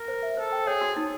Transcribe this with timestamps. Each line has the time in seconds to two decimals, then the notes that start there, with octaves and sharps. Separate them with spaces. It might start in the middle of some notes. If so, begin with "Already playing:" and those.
Already playing: A#4
0.08 C5
0.23 E5
0.37 A4 C5
0.52 G5
0.67 G#4 C#5
0.81 F#4
0.96 D#4